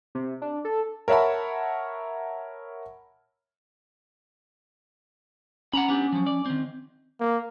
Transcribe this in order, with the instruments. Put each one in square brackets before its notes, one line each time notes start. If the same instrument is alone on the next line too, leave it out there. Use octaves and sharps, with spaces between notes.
[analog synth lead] C3
D4
A4
[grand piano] A#4 C#5 E5 F#5 A5 B5
[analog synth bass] C#4 [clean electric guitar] F#5 A#5 B5
[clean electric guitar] B3 D4 G4
F3 F#3
D5
D#3 C4
[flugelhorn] A#3